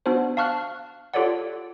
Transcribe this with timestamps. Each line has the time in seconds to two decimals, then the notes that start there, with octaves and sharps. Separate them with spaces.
0.06 B3 D4 F#4 C5
0.37 F5 A5 C#6 F6 F#6
1.14 F4 G4 A4 C#5 D5 F#5